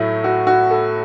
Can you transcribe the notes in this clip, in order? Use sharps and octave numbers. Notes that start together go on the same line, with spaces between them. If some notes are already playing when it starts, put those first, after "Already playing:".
Already playing: A2 F#3 A3 E4
F#4
F#4
A4